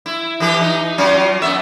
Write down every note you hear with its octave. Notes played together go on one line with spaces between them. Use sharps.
E4
E3 G4 B4
D#4
F#3 C#4 F4
F#2 B3 E5